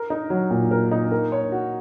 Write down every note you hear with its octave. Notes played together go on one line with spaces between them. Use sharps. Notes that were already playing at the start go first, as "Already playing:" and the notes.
Already playing: A#4
D#4
F#3
A#2
A#4
D#4
A#3
C#5
F#4